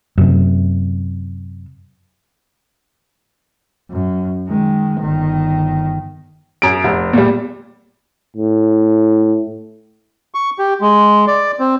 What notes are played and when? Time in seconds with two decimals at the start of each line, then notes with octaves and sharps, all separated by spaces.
0.18 F#2 C3
3.91 F#2
4.48 D#3 G#3
5.00 G1 D#3
6.62 F#2 D7
6.84 F1
7.13 A#2 G3
8.37 A2
10.34 C#6
10.59 G4
10.81 G#3
11.27 D5
11.60 C4